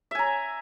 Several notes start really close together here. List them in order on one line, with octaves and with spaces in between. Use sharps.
E5 G#5 A#5